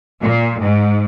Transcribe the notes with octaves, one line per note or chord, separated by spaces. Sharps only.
A#2
G#2